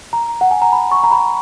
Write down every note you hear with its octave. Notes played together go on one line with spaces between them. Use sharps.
A#5
F#5
G#5
A#5
B5
C#6
A#5
B5